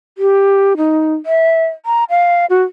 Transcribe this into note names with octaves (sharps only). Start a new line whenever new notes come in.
G4
D#4
E5
A#5
F5
F#4